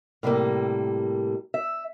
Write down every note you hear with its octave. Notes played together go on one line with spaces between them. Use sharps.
A2 C3 G3 A3 A#3
E5